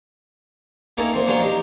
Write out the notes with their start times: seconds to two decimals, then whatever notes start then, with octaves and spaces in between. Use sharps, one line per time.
0.97 A#3 C#4 D#4 E4 A4
1.13 A#2 C4
1.26 F3 F#3 A#3 C#4 D4 C5
1.40 D#4 G4